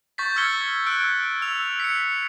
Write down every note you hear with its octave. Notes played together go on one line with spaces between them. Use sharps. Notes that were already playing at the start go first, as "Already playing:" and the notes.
C#6 G6 A6 B6
E6 F6 G#6 C#7 G7
E6 F#6 D7
E6 F7
B6 C#7